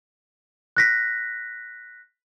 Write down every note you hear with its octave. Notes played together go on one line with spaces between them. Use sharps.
F#6 A#6 B6